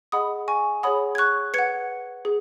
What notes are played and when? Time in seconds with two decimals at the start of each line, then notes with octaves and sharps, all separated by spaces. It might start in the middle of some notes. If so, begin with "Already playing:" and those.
0.12 G#4 D#5 F#5 B5 D#6
0.48 G#5 C#6
0.83 G#4 C#5 F#5 B5 D#6
1.15 G#6
1.18 C#6 F#6
1.54 B4 F#5 G#6 C#7
2.25 G#4